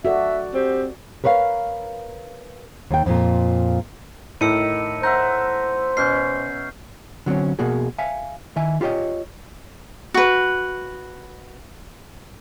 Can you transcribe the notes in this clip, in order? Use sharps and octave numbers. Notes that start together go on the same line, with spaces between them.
F#4 A4 D5 E5
C4 G4
A#4 B4 C#5 D5 F5
D#2 G5
F2 A#2
A2 D#3 E6 C#7 D#7
C5 E5 F#5 A#5 G6
B2 C#4 G6 C7
D3 F#3 C4 C#4
B2 A#3 F#4 G#4
E5 F5 G#5
D#3 E5 G#5
F4 G4 A4 C#5 D#5
F#4 B4